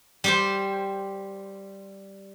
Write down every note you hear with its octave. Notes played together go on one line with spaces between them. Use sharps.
G3 G4 C5